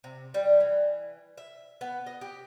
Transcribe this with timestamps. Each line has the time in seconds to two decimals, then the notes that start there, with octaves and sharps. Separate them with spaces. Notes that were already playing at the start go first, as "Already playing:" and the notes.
0.04 C3
0.34 G3
0.60 E3
1.38 E5
1.81 B3
2.06 D#5
2.21 G4